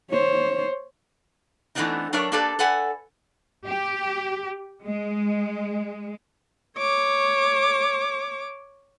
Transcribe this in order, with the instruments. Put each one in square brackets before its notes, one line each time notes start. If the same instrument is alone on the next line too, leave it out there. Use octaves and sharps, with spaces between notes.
[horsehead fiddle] C5 C#5
[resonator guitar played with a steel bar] E3 A3 B3 C4 D4 D#4
F#3 D4 A#4 C#5 D5 E5
A#3 D4 G4 A4 B4 D5
A4 B4 D5 F#5 G#5
[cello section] G4
G#3
[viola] C#5 D6